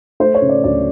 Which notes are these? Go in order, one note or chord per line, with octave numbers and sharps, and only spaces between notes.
A3 C5
C#5
C#3
D5
D2 D5